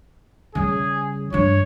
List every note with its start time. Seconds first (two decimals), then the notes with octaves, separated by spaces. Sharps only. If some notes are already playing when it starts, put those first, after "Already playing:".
0.55 C#3 G3 G#4
1.33 G2 D4 C#5